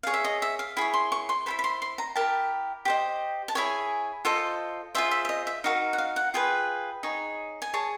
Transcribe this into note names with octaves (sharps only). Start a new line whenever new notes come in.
G#4 C#5 F5
E5
D#5
E5
F5
E4 G#4 C#5 B5
C6
C#6
C6
E4 A4 C5 B5
B5
C6
C6
A#5
E4 G4 A#4 A5
G4 C5 D#5
A5
E4 G#4 C#5 G#5
F4 A4 C5 D#5
F4 G#4 C5 E5
E5
E5
D#5
E5
D#4 F#4 A#4 F5
F#5
F5
F#5
F4 G#4 B4 G5
D#4 G#4 C#5
G#5
G#4 C#5 A5